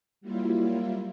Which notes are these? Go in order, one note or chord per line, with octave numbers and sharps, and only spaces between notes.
F#3 G3 A#3 E4 F4